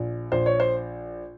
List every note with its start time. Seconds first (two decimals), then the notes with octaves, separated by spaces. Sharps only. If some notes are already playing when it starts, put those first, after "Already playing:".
Already playing: A#1
0.32 A#1 C5
0.46 C#5
0.60 C5